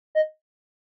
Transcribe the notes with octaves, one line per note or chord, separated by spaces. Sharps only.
D#5